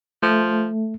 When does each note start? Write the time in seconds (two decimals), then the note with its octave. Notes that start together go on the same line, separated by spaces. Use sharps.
0.23 F3 A3